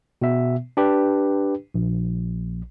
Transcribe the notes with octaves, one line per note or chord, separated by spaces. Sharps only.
B2 B3 E5
D4 G4 B4
A#1